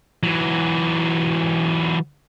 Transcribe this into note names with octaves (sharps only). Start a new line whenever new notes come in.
E3 F#3